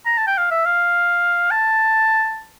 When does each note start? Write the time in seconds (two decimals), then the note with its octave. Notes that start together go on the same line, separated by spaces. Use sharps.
0.06 A#5
0.18 A5
0.27 G5
0.38 F5
0.51 E5
0.66 F5
1.51 A5